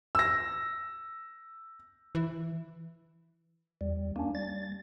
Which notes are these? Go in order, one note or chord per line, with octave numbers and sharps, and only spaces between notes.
E6 A#6
E3
E2 G3
A#3 C#4 D4
G3 A6